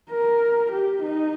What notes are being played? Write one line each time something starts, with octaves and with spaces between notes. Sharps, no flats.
A#4
G4
D#4